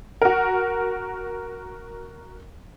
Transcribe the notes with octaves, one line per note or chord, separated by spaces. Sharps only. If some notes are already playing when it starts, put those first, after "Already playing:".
F#4 A#4